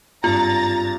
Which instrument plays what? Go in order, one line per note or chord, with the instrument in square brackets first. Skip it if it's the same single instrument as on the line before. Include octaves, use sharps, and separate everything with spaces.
[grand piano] G#1 G2 [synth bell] F4 [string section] A#5 A6